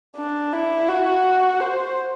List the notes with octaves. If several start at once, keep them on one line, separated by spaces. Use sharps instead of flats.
D4
E4
F#4
C5